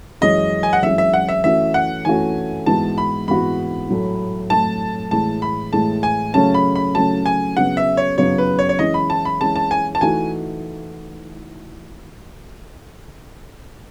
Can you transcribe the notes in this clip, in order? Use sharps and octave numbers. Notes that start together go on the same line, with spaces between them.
F#2 E3 G#3 C#4 D#5
G#5
F#5
F#2 E3 G#3 C#4 E5
E5
F#5
E5
E3 A3 C#4 F#4 E5
F#5
E3 A3 C#4 F#4 G#5
G#2 E3 B3 F#4 A5
B5
G#2 E3 B3 F#4 B5
A2 F#3 A3
A2 F#3 A3 A5
A2 E3 G#3 A5
B5
A2 E3 G#3 A5
G#5
C#3 F#3 A3 C#4 A5
B5
B5
C#3 F#3 A3 C#4 A5
G#5
C#3 F#3 B3 F#5
E5
C#5
C#3 F#3 B3 C#5
B4
C#5
C#5
E3 G#3 C#4 E4 D#5
B5
A5
B5
E3 G#3 C#4 E4 A5
A5
G#5
A5
E3 A3 D#4 F#4 G#5